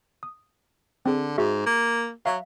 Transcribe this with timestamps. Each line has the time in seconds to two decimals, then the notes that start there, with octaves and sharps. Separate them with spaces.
0.23 D#6
1.06 D3 C4 G#4
1.38 G#2 F#4 G#4 E5
1.66 A#3
2.26 F#3 E5 F5